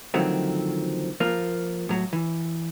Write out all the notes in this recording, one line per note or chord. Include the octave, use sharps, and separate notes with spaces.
D3 D#3 F3 F#3 A3 C4
F3 A#3 F4
A2 F#3 F#4
E3